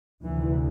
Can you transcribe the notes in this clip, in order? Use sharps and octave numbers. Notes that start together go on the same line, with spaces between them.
D2 C3 E3